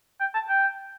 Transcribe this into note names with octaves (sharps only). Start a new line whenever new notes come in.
G5
A5
G5